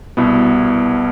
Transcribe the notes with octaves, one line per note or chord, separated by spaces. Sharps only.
C2 B2 B3 E4